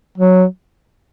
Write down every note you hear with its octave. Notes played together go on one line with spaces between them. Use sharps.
F#3